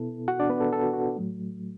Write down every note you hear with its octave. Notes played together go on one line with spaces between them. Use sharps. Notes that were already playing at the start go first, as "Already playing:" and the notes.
Already playing: B2 B3 E4 A4
F#4 F#5
D4 D5
B3 B4
A4
A4
F#4
F#4
A2 F#3 A3